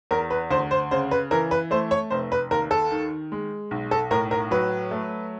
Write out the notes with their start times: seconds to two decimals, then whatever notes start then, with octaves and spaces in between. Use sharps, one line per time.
0.11 E2 A#4
0.30 B4
0.51 D2 C5
0.71 C5
0.91 C#3 C5
1.11 B4
1.31 E3 A#4
1.51 B4
1.71 A3 C5
1.91 C#5
2.10 F1 C5
2.32 B4
2.51 D#2 A#4
2.71 A4
2.91 D#3
3.32 G#3
3.71 B1
3.91 A4
4.11 A2 A#4
4.31 A#4
4.51 F#3 B4
4.91 A3